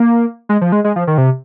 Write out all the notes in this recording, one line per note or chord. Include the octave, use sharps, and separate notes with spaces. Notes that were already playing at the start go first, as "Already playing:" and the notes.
Already playing: A#3
G#3
F3
G#3
G#3
F3
D#3
C3